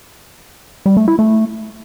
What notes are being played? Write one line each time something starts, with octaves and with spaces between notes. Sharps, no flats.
G3
A3
E4
A3